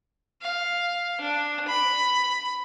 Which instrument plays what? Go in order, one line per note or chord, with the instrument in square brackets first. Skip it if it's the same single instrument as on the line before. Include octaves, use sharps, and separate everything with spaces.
[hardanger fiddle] F5
D4
B5